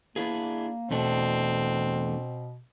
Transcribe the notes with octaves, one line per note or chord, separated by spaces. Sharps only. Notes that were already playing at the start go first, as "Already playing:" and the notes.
A#3 D4 E4 G#4
E2 B2 A3 C4 D4